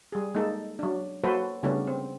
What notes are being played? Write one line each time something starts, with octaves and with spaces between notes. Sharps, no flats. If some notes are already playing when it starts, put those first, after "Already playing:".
G3 G#4
G#3 A#3 D#4 A4
F#3 D4
F#3 A#3 F#4 A4 B4 C5
C#3 G3 A3 B3 C#4 D4
C4